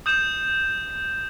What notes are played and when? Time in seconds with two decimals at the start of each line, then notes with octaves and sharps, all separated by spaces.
0.06 D#6 G6 E7